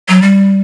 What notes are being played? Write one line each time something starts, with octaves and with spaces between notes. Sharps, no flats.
F#3
G3